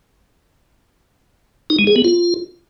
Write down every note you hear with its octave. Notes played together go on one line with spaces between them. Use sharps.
D#4
G#3
G#4
B3
F4